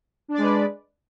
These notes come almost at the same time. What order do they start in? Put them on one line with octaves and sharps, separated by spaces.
D4 D5 G#3 B4